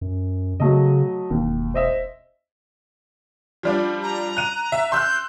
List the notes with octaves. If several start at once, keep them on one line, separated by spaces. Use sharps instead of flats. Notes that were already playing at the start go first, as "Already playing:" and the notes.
F#2
C#3 F#3 A3 D#5
E1 D#2
C5 D#5 E5
F3 G3 D4
A#5
F#6 D#7
E5
C6 E6 F#6 G6